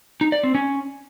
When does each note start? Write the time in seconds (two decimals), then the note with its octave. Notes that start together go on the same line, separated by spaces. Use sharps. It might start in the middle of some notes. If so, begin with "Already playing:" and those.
0.21 D#4
0.32 D5
0.43 C4
0.55 C#4